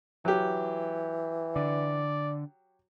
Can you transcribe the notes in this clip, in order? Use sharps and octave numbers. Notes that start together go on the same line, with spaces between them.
E3 F#3 G4
D3 D5